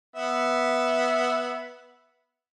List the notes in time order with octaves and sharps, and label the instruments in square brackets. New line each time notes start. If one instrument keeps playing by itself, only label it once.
[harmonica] B3 E5